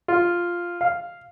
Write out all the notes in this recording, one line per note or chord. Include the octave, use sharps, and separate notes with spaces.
F4
F5